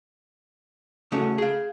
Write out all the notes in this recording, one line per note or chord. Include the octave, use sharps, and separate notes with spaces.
C#3 A3 C#4 F#4
G#4 F5